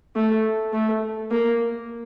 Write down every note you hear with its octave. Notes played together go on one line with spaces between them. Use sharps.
A3
A3
A#3